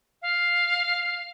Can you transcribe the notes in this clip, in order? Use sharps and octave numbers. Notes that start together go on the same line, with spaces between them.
F5